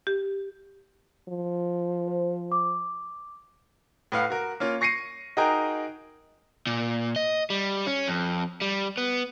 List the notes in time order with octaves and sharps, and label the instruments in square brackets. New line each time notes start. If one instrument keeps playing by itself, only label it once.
[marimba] G4
[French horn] F3
[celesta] C5
D6
[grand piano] A2 B4 F5 F#5
F#4 A#4
A#3 C#4 F4
C#6 A#6 C7 C#7 D#7
D#4 F#4 G#4 A#4 G5 A#5
[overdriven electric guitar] A#2
D#5
G3
C#4
F2
G3
B3